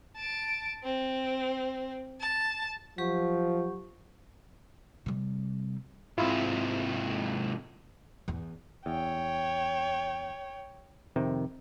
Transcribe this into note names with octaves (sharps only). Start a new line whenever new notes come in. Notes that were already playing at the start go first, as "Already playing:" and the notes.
A5 D7
C4
A5
F3 F#3 G4 C#6
C3 G3
G#2 C3 E4 F4
E2
E2 C#5 G5
F2 C3 D#3